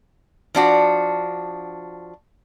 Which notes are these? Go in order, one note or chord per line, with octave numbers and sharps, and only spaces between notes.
F3 D4 F#4